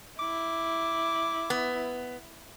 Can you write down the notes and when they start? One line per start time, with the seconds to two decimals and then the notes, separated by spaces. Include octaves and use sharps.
0.20 E4 D6
1.50 B3